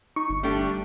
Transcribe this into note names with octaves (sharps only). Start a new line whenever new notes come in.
D#4 C#6
G1
G3 A3 D4 G4